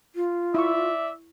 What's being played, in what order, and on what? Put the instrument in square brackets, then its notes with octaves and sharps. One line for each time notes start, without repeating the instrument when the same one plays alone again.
[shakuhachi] F4
[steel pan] E4 C#6 [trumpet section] D5 E5